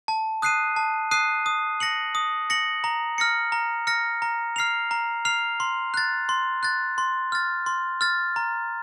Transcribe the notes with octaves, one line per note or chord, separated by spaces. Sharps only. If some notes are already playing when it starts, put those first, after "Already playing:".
A5
D#6 F#6 C7 D#7
A5
D#6 F#6 C7 D#7
D#6
A#6 C#7 F#7
D#6
A#6 C#7 F#7
A#5
F6 A#6 C#7
A#5
F6 A#6 C#7
A#5
F6 C7 F7
A#5
F6 C7 F7
C6
F#6 A6
C6
F#6 A6
C6
F6 A6
C6
F6 A6
A#5